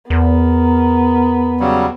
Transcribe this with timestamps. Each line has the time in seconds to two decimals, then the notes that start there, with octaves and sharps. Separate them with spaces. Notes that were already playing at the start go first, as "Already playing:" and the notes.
0.10 E2 B3 A#4
1.60 C#3 F#3 G3